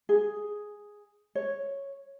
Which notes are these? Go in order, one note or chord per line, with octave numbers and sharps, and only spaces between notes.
G#4
C#5